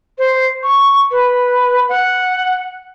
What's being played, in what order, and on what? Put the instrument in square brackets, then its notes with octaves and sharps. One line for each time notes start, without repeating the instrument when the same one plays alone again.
[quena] C5
C#6
B4
F#5